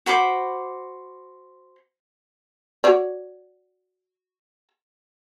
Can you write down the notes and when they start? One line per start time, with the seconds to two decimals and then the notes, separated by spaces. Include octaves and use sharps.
0.06 F#4 C5 B5 D6
2.84 F#4 C#5 D5